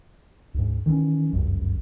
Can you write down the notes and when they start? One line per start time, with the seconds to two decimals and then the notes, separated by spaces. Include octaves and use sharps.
0.54 D2 G#2
0.86 D#3 E3 G3 C#4
1.33 G1 C#2 F#2